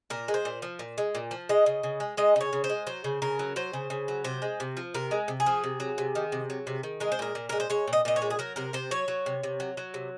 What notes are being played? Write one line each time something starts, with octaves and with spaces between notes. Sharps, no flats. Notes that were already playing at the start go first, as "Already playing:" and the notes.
A#2 A#4
G#3
C5
A#2
F3
A#2
G#3
A#2
F3
G#3 D#5
C#3
C#3
G#3
G#3 D#5
C#3 C#5
C#3
C5
G#3
F#3 C5
C#3
C#3 A#4
F#3
F#3 C5
C#3
C#3
F#3
C3 C5
G#3
C3
F3
C3 A#4
G#3
C3
G#4
F3
C3
F#3
C3
D#3
C3
F#3
C3
D#3
G#3 A#4
C5
A#2 A#4
A#2
G#3 A#4
C5
G#3 C#5
A#2
D#5
A#2 D#5
C#5
G#3
G#4
F#3 A#4
C3 A#4
C3 C5
F#3 C#5
F#3
C3
C3
F#3
F#3
C3